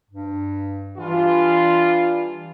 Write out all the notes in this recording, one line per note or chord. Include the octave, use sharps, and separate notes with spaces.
G2
E3 G3 D4 F4